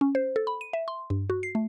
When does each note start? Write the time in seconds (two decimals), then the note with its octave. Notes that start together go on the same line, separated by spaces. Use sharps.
0.01 C#4
0.15 C5
0.36 A4
0.47 B5
0.61 D#7
0.73 E5
0.88 C6
1.10 G2
1.30 F#4
1.43 C7
1.55 A3